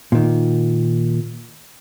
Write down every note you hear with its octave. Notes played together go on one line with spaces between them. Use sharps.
A#2 D#3